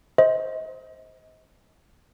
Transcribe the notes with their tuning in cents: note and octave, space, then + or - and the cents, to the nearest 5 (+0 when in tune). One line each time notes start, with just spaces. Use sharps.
C5 +0 D#5 +30